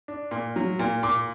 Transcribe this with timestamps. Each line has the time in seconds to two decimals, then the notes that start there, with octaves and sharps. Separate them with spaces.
0.08 D4
0.31 A#2
0.56 F#3
0.79 A#2
1.03 A#2 D6